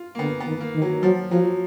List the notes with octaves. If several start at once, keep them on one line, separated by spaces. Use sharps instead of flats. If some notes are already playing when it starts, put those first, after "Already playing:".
Already playing: F4
A#3
D3 B3
B3
D#3
A#3
D#3
F#3
F3 F#3
F3 F#3